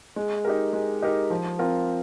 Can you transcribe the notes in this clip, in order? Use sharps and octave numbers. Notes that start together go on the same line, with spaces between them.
G#3
D#4 G4 A#4
G#3
D#4 G4 A#4
F3
C4 F4 A#4